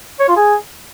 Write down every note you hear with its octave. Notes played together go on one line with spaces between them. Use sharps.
C#5
F4
G#4